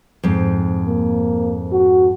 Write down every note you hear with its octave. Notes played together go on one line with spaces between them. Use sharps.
F2 G#2
A#3
F#4